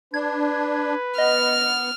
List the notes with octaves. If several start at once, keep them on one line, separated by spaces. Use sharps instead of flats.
D4 B4 G#6
B3 D#5 F6